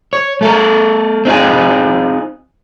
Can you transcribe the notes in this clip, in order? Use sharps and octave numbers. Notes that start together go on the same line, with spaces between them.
C#5
A3 A4 A#4
C4 D#4 F4 G#4